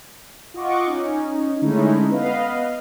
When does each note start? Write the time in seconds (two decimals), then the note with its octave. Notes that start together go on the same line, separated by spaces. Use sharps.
0.54 F4 D#5 F#5 C#6 D6
0.87 C#4 D#4
1.62 D3 G#3 A3 C#4 D#4 E4
2.10 B3 B4 D#5 F5